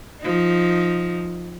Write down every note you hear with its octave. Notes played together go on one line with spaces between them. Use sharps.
F3 D#4